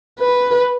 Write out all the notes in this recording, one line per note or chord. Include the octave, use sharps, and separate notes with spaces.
B4